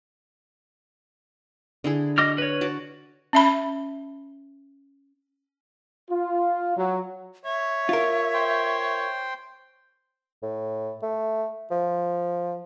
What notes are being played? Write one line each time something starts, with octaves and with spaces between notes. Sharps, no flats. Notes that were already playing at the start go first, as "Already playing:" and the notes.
D3 E4 G#4
F#4 D#5 D6 F6
B4 C#5
F#4 A5 D6
C#4 E5 B5
F4
F#3
C#5 E5
F4 A#4
C5 G5 C6
A2
A3
F3